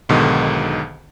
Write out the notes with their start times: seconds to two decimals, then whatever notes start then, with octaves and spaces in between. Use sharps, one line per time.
0.09 B1 G#2 B2 D3 D#3